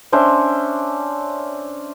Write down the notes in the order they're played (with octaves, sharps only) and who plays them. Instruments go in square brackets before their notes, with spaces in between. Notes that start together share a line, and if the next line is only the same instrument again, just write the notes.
[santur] C#4 D4 C5 E5